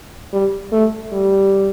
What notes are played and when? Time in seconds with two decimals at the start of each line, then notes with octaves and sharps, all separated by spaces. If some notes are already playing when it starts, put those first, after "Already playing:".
0.33 G3
0.72 A3
1.12 G3